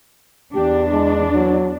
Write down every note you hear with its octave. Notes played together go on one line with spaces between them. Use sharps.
E2 D4 G4
G#3
F#3